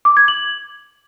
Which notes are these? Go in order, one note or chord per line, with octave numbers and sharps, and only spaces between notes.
D6
G#6
F#7